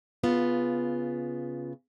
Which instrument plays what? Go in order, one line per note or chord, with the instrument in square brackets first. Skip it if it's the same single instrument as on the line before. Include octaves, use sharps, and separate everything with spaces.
[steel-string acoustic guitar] C#3 B3 F4